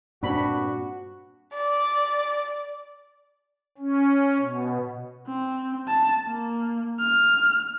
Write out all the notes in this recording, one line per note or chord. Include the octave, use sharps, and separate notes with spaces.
G2 A#2 C4 D4 F#4 B5
D5
C#4
B2
C4
A5
A#3
F6